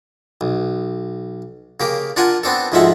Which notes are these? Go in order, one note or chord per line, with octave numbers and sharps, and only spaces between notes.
B1
C#3 A#3 G4 A#4
D4 F4 A#4 F#5 G#5
B3 C4 D4 A4
D2 G#2 F3 G#3 E5 F#5